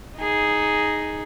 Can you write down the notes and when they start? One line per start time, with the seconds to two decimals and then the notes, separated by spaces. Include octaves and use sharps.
0.19 D#4 G#4